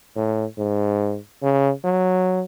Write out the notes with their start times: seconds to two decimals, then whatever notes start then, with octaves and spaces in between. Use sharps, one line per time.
0.16 A2
0.58 G#2
1.42 C#3
1.84 F#3